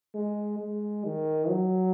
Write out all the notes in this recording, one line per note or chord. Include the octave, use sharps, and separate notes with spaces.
G#3
G#3
D#3
F#3